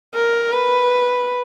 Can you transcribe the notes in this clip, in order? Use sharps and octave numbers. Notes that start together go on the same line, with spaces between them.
A#4
B4